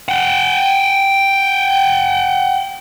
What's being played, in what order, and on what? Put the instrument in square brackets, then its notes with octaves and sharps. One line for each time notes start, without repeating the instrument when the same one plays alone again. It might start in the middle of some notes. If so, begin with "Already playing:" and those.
[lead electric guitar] F#5 G5